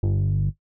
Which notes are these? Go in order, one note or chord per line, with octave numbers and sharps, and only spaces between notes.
G1